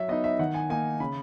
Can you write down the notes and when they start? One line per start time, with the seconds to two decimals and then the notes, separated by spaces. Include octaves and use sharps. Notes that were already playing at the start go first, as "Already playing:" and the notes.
Already playing: F#3 E5
0.08 B3 D#4 D#5
0.24 E5
0.39 D#3 F#5
0.54 G#5
0.70 A#3 D#4 G#5
1.00 C#3 B5